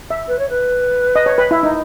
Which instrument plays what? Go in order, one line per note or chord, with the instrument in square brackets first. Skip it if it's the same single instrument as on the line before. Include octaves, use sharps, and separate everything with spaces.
[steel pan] E5
[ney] B4
C#5
B4
[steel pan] D#5
C#5
B4
E4
D#4